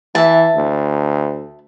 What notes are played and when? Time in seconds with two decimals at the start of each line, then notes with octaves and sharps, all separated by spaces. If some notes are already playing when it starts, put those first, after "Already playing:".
0.15 E3 E5 A5
0.56 D2